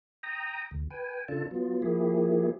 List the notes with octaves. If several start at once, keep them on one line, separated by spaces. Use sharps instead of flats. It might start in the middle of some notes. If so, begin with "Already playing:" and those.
G5 A#5 D#6
D2
B4 G5 G#5
C#3 D4 F4 A4 A5
F#3 B3 F4
F3 A#3 E4 G4 G#4